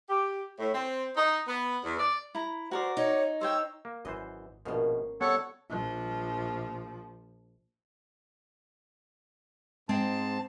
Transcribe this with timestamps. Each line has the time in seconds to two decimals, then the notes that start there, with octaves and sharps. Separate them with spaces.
0.09 G4
0.58 A2
0.74 C4
1.17 D#4
1.47 B3
1.83 E2
1.99 D5
2.35 E4 A#5
2.71 F#4 A#4 C5 D5
2.97 D#4 C#5
3.41 C5 C#5 G5 E6
3.85 A#3
4.05 G#1 F#2 E3 C5 D#5
4.65 A#1 B2 F3 A#3 C#4
5.21 C3 G3 B3 A4 C#5 F#5
5.70 A#1 F3
9.89 G#2 G#3 C4 G5 A5